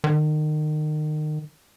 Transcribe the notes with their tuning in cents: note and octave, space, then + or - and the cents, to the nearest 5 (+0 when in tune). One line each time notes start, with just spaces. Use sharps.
D#3 -30